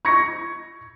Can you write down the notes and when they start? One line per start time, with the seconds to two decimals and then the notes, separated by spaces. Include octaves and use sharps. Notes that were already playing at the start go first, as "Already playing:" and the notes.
0.05 C#6 G#6 A#6 C#7